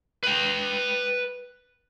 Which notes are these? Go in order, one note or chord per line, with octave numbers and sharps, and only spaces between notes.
B4 G5